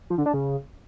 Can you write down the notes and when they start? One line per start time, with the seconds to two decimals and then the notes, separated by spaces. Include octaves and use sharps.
0.10 F3
0.18 D3
0.26 D4
0.34 C#3